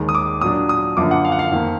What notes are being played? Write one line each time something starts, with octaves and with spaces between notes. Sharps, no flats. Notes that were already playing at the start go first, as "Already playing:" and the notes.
Already playing: D#2 D#3 G#3
D#6
D6
A#2 F#3 D4 D#6
D#6
F#2 D3 F3 A#3 D6
F#5
F5
F#5
F5
F2 D#3 A#3